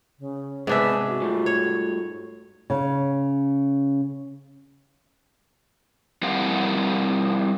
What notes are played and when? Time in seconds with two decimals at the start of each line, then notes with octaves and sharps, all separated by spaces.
0.19 C#3
0.67 G#2 C3 B3 D4 D5 E5 G#5
1.08 F#4
1.22 G3 A3 F4
1.46 C#5
2.70 C#3
6.22 G3 C4 E4 A#4 F5 F#5